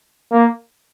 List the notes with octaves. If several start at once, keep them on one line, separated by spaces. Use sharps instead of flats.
A#3